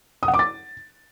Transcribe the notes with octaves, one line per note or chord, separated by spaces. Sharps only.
D#6
F#5
D6
A6